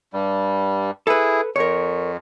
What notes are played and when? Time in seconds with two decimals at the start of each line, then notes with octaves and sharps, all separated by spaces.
0.13 G2 G3
1.07 E4 G#4 A4 B4
1.56 F2 A#4 C#5